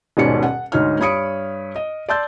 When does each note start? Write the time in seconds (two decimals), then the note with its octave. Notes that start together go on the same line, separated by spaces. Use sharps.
0.17 D#1 G#2 B2 C#4 D5 C#7
0.42 F#5
0.72 D2 G#2 D#4 C#5 F6
1.00 G2 C#5 B5 D#6 C#7 D7
1.76 D#5
2.09 D5 A5 C6 E6 G6 A6